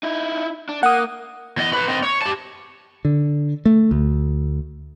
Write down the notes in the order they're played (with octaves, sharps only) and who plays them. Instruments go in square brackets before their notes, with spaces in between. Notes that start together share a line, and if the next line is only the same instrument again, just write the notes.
[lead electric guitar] D#4 E4
D4
[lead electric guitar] A#3 [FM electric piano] F#5 D#6
[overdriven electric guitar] E2 D#5
B4 C#5
C4 D#5
C#5
G4 A5
[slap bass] D3
A3
D2